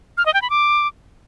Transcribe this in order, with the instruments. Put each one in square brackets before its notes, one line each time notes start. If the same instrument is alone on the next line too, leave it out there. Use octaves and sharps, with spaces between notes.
[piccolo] F6
D#5
G5
B5
D6